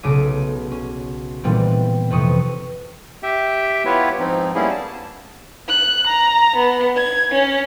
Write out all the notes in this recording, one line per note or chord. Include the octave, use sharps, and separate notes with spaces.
B1 C#3 A3 D6 D#7
C#4
A#2 D#3 E3 G3 B3 C4
F2 C3 E3 C#6 D#6
G4 E5 G5
B3 E4 F4 G4 B4 C#5
G#2 F3 C4 D#4
G3 A#3 B3 C#4 E4 G#4
A5
F#6
A#5
B3
G#6
C#4